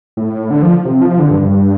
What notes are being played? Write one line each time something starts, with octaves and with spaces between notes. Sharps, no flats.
A2
D3
F3
C3
F3
D3
G2
G2